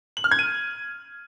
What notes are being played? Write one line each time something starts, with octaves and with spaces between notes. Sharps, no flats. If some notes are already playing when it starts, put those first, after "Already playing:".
F#7
F6
G#6
D#7